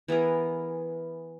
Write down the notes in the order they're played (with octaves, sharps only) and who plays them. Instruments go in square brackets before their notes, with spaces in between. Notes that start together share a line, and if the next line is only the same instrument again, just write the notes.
[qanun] E3 B3 G#4 A#4